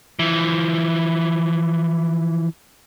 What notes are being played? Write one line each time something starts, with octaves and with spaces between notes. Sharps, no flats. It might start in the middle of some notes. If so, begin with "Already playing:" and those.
E3 F3